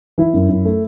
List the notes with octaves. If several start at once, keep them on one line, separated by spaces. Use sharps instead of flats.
E3 E4
F#2
F#2
A3